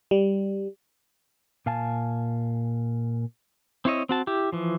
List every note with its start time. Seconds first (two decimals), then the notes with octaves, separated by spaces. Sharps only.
0.11 G3
1.66 A#2 F5 G#5 A5
3.85 C4 E4 C#5 D#5
4.09 C4 F#4 A5
4.27 E4 G4
4.52 E3 F3